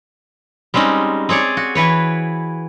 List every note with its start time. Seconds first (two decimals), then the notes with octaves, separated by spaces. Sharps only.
0.74 G3 G#3 C4 C#4 D#4
1.29 C4 G#4 C#5 D5
1.57 F#4
1.75 E3 B4 C#5